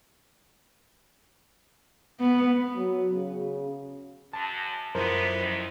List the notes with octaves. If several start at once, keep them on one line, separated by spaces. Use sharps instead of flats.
B3
F#3
C#3
F#2 A5
F#2 D3 F3 G#3 B3 E4 A#4 C5
D#2 D#3